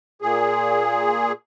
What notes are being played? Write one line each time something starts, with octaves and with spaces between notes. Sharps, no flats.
A#2 G#4